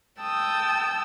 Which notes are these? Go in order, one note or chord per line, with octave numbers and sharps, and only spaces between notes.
G5 A5 D#6 E6 G6